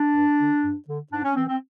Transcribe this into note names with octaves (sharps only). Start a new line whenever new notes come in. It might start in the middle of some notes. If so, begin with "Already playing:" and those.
Already playing: D4
G2
D3
G2
D3
G#2 D4
C#4
E3 C4
C4